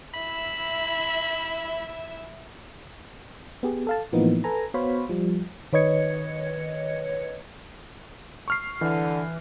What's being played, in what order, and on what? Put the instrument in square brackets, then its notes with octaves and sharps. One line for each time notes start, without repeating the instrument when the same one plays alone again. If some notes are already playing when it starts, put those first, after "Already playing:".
[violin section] E4 E5 [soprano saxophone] B5
[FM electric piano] B3 G4 G#4
A4 F5 A5
A2 E3 F3 A#3 B3 D#4
A4 B4 G#5 A#5
B3 F#4 C5 C#5 F5 B5
F3 G3
D#3 B4 C#5 D#5 G#6 C#7
[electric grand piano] C#6 F6 C7
[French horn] D3 [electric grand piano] E3